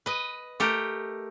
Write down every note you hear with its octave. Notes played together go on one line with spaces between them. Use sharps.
B4 D#5
A3 G4 A#4